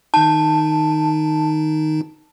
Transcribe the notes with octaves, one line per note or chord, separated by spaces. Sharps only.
D#3 D#4 A5